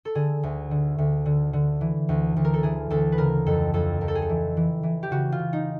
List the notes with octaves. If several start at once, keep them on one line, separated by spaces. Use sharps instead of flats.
A4
D3 G#4
D2
D3
D2
D3
D3
E3
D2
D2
A#4
A4
E3 G#4
D2 A4
B4
C#3 A#4
F2 A4
F2 A4
F2 A#4
A4
G#4
A4
E3
E3
E3
G4
C#3 F#4
F4
C#3
D#4